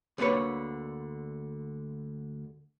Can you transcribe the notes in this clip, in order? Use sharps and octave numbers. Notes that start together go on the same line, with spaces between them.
D2 D3 A#3 B4 C#5